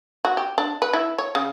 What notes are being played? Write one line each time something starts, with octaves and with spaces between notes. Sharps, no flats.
F#4
G4
D4
B4
E4
C#5
C#3